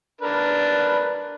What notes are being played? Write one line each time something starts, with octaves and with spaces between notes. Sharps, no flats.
D4 A#4 B4